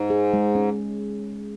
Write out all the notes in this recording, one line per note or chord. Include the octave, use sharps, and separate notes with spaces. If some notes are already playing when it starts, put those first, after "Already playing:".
Already playing: G#2
G#4
G#3
C#4